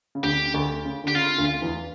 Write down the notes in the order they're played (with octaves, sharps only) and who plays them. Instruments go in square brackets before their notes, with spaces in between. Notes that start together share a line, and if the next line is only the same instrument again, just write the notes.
[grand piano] C#3
[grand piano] D2 D3 [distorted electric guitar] G4
[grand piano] D2 D3
C#3
[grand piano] D3 [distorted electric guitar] G4
[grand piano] C#3 [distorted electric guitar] F4
[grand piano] D2 D3
E2 E3